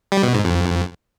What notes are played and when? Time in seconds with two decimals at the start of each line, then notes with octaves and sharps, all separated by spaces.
0.12 G3
0.23 B2
0.34 G#2
0.45 F2